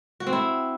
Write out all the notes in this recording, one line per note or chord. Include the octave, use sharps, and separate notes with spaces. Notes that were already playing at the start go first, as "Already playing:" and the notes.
F#4
C4
E4